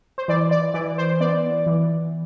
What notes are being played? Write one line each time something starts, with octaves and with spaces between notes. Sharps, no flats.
C5
E3 D5
D5
E3 D5
C5
B3 D5
E3